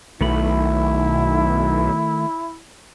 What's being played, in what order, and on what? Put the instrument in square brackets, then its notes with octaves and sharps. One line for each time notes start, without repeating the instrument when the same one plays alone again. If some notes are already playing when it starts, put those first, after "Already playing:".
[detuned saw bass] B1 [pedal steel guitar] D#3 A3 B5 [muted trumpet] E4